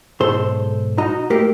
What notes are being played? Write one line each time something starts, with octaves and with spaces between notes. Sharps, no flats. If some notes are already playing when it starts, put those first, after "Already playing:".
B1 G#2 A4 C5 C6
D#4 F#4 D#5 A#5
A3 A#3 G4 A#4